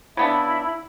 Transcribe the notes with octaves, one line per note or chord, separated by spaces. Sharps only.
C#3 B3 D4 E4 E5 B5